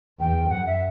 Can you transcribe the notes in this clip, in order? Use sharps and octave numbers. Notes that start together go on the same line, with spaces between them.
E2 G5
F#2 F#5
E5